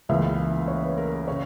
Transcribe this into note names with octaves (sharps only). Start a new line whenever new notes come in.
C#2 C#3 E3 A#3 E5
C#5
B4
A#4
C#3 C#5